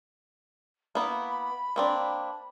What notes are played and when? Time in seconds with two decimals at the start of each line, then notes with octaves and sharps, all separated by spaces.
0.95 A#3 B3 E4 B5
1.76 A#3 C4 D4